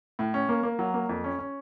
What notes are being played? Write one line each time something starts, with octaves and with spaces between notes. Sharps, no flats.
A2
C#4
A#3
A#3
F#3
A#3
F2
C#4
C#4